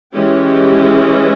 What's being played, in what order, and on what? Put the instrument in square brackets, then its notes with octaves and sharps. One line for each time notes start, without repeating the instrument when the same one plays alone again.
[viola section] E3 G#3 C#4 G4